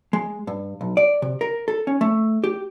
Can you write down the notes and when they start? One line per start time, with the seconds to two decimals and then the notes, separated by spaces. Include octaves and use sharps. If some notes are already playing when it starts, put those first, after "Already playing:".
0.13 G#3
0.47 G2
0.81 B1
0.97 D5
1.22 C3
1.41 A#4
1.68 A4
1.87 C#4
2.01 A3
2.44 G4